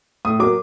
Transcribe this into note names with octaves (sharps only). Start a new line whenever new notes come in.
A2 D#6
F#3 A#3 D6